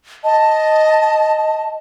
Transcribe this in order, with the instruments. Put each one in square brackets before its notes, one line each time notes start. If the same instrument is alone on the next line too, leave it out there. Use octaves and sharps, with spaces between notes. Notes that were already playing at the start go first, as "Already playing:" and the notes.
[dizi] D#5 [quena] A5